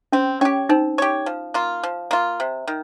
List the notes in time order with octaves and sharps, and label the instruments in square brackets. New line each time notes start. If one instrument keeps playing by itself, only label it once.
[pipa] C4 [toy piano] C#4
[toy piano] C#4 [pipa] G4 C#5
[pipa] C4 [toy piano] D#4
[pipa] G4 C#5
F3
A#3 F4
F3
A#3 F4
C3
D#3